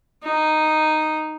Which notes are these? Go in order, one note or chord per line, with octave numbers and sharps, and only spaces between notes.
D#4